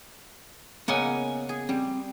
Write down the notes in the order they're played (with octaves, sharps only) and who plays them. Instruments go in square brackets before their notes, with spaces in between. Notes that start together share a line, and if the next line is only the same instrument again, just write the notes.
[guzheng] C#3 G#3 A#3 [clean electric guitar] B3 F#5 G#5
[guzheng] G#4
[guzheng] G3 [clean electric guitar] C4